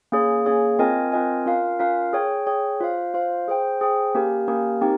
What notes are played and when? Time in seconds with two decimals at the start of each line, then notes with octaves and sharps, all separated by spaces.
0.12 A#3 C#4 G#4 C#5
0.46 A#3 C#4 G#4 C#5
0.79 C4 F4 A#4 D#5 G#5
1.12 C4 F4 A#4 D#5 G#5
1.46 C#4 F4 A#4 F5
1.79 C#4 F4 A#4 F5
2.13 G#4 C#5 G5
2.47 G#4 C#5 G5
2.80 F4 C5 F5
3.14 F4 C5 F5
3.48 G#4 C5 G5
3.81 G#4 C5 G5
4.15 A#3 C#4 G4 A#4
4.48 A#3 C#4 G4 A#4
4.81 C4 D#4 G4 A#4